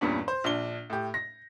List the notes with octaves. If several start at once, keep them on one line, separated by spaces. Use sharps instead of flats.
E2 G2 A#2 G3 C#4 D4
C5
A#1 D4 G7
A2 G4
A#6